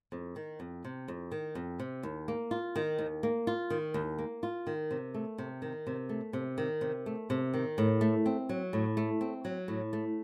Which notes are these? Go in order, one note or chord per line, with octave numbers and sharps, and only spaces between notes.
F2
D#3
F2
C3
F2
D#3
F2
C3
D#2
A#3
F4
D#3
D#2
A#3
F4
D#3
D#2
A#3
F4
D#3
C3
A3
C3
D#3
C3
A3
C3
D#3
C3
A3
C3
D#3
A2
A3
C4
F#3
A2
A3
C4
F#3
A2
A3